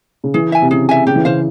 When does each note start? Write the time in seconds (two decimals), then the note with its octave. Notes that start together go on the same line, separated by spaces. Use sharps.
0.24 C#3
0.34 E3 G#4
0.52 E5 G#5
0.62 C3
0.71 C#3 G#4
0.89 E5 G#5
1.07 C#3 G4
1.16 E3
1.25 C#3 C5 F5